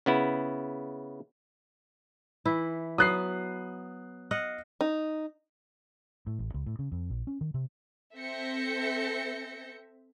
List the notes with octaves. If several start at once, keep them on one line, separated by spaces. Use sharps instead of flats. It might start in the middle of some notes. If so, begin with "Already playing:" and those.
C#3 B3 E4
E3 E4
F#3 B3 D#6 F#6 C7
D#5 F5 F#5
D#4
A2
A1
C#2
A2
C#3
F2
A#1
C#4
D#3
C3
C4 A4 E5 G6 A#6 C#7